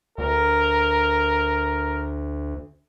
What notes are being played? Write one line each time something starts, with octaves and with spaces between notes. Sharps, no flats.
D2 A#4